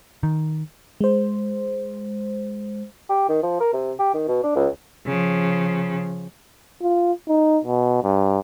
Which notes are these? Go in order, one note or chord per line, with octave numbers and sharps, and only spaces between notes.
D#3
G#3 C5
G4
D#3
F3
A#4
C3
G4
D#3
B2
D4
C#2
C#3 F3
F4
D#4
B2
G2